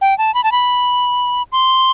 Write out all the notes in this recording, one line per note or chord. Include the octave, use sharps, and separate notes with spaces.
G5
A5
B5
A5
B5
C6